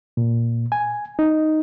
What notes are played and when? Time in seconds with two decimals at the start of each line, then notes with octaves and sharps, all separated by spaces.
0.17 A#2
0.72 G#5
1.19 D#4